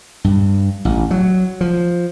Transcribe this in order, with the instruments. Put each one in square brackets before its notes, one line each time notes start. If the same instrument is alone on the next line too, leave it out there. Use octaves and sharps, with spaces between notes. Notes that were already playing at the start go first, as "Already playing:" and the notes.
[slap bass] G2
A1
F#3
F3